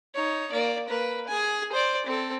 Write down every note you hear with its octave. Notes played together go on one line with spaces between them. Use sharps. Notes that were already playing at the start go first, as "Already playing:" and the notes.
D#4 C#5
A#3 D5
A#3 B4
G#4 G#5
C5 D5
C4 A4